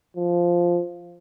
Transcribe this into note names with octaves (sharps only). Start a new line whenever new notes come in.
F3